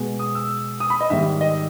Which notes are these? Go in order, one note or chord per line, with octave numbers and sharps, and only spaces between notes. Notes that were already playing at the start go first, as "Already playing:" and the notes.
Already playing: B2 G#3
D#6
E6
D#6
B5
D#5
G#2 D#3 G3 E5
D#5